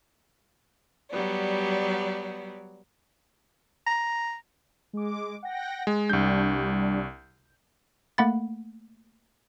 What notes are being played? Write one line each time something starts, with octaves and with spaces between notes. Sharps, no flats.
F#3 G3 B3 D5
A#5
G#3 D6
F#5 G5 A#6
G#3
C2 G3 D4 G6
A3 A#3 F#5 B5 A6